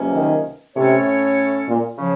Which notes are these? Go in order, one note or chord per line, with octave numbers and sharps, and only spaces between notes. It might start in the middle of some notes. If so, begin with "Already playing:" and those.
Already playing: C#2 C3 F#3 A#3 C#4
D#3
A2 C3 A3 C#4 A4 C#5
A#2
C#3 F3